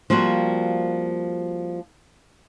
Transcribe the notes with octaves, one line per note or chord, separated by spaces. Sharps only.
F3 G3 A#3 C4 F#4